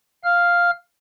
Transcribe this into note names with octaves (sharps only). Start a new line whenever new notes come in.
F5 F6